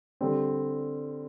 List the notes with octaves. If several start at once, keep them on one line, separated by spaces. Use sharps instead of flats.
D3 G3 C4